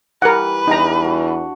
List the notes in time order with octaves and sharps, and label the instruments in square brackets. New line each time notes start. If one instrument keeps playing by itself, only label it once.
[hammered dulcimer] E3 G3 [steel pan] A#4 F#5 [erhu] B4
[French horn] E2 [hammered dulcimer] G3 D4 [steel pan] D#4 A#5
[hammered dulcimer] F#4